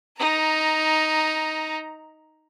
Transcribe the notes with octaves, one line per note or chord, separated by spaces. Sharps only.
D#4 A#5